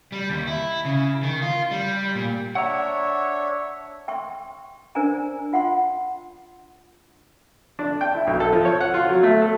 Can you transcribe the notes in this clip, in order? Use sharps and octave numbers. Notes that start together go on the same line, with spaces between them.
G3
D#2
E4
C#3
D#3
F4
G3
A#2
D4 C#5 E5 F#5 A#5
G5 C6 C#6
D4 A#4 C5 D5 G#5 A#5
F4 F#5 G5 C6
D4
G5
E4
B1
A4
F3
C#5
F#5
F4
F#3
A3
A4